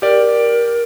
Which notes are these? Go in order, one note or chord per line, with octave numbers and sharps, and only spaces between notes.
G4 A#4 D5